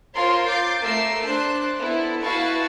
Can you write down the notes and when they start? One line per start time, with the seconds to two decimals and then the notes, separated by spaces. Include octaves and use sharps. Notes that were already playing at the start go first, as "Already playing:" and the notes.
0.15 F4 A#4 C5 C#5 C6
0.48 D6 G6 A6 C7
0.83 A3 A#4 E6 C7
1.26 D4 C5 F#6
1.78 B3 E4 A4
2.21 E4 F#4 B4 F5 A5 C#6